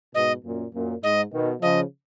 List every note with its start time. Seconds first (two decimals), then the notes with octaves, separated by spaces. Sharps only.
0.15 G#2 B2 D#5
0.45 F#2 A#2
0.74 F#2 A#2
1.03 G#2 D#5
1.33 B2 D#3
1.62 C#3 F3 D#5